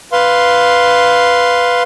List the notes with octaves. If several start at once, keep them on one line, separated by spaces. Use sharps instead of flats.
B4 F5 C6